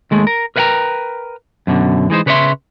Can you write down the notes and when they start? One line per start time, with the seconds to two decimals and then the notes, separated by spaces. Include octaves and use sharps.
0.11 D#2 G#3 A3
0.27 A#4
0.56 A#4 B4 E5 F#5 G5 A#5
1.67 F#2 B2 D3
2.10 E3 G#3 D#4 C5
2.26 C#3 B4 C#5 D5 E5 C6